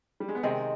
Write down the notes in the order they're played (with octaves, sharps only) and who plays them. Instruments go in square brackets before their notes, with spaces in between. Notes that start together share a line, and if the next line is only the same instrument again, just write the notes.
[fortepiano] G3
G#3
B3
[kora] C3 D#3 G#3 [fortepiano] C4